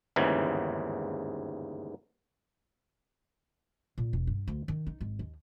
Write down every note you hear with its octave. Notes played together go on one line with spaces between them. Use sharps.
G1 D#2 G#2 C#3 E3
A#2
E1
G2
D2
D#3
D#4
G#1
D#2